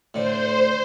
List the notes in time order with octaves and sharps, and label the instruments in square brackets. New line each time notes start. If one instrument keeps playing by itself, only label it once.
[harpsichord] A2 D3 [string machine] C5